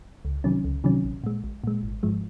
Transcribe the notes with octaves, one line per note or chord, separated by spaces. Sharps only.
C#2
C3 D#3 F#3 C#4
C#2
C3 D#3 F#3 C#4
A#1
A#2 G#3
A#1
A#2 G#3
G#1
G#2 F3 G#3